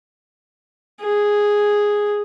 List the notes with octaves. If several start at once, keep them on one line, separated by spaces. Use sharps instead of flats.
G#4